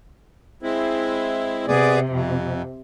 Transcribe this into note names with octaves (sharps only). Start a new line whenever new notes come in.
G#3 C4 E4
C3 B3 G#4 D5
F2